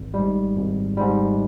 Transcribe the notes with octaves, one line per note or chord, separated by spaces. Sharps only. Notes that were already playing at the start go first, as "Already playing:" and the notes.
Already playing: G#1
G#2 G3
G#1
G#2 G3